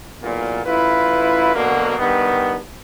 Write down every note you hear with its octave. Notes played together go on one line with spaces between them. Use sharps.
B1 E2 A#2
A1 E4 F4 B4
B2 D3 F#3 A#3
G2 D#3 B3